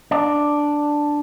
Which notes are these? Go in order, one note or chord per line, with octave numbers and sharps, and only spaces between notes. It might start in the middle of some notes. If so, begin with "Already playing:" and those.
D4